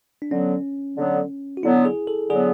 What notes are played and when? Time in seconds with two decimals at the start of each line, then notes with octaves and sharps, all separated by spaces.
0.22 D4
0.31 D3 F#3 B3 C#4
0.97 D3 F#3 B3
1.57 F#4
1.63 D3 F#3 B3 E4
1.85 G#4
2.07 A4
2.29 D3 F#3 B3 G#4